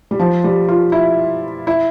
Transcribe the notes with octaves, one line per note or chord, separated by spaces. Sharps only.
G3
F3
G3
F4
E4
E4